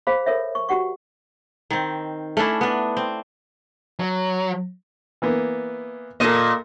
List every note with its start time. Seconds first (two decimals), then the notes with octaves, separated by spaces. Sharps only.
0.07 G#4 C5 F5 B5
0.26 A4 A#4 C#5 E5
0.55 C#6
0.69 F#4 G4 F#5 C#6
1.71 D#3 C4
2.37 A3 C#4 D4 E4
2.61 B3 D4
2.97 C4
4.00 F#3
5.22 E3 A#3 B3
6.20 A#2 A#3 A4 D#5